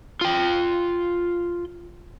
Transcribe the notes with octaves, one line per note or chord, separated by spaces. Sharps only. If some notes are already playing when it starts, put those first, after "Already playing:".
F4 G5